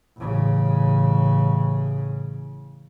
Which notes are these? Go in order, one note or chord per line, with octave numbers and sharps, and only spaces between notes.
A1 C#3